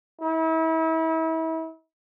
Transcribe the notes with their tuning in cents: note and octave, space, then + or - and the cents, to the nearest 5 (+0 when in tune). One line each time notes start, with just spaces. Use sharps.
E4 -35